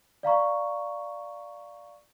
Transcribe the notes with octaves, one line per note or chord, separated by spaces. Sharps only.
D5 F5 A#5 C#6